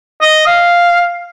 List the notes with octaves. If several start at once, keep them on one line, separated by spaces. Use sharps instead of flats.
D#5
F5